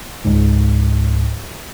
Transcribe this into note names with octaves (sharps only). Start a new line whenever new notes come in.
C#2 G#2